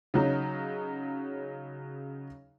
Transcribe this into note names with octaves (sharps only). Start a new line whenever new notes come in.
C#3 F#3 D#4